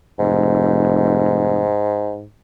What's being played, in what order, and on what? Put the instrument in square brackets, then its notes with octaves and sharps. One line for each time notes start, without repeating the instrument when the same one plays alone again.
[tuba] F1 [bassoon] G#2